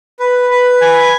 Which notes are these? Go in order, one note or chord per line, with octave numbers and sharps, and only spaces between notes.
B4
B4
G#5